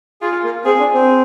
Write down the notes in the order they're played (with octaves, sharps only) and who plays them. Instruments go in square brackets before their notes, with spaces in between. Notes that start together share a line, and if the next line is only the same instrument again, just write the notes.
[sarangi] F4 [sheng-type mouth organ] G#4
[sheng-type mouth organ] A#3
[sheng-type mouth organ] C4 [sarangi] G#4
[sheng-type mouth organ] D4
C4